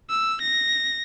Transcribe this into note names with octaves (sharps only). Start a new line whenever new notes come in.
E6
A#6